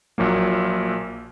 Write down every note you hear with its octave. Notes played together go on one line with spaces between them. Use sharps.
A#1 A#2 F#3 A#3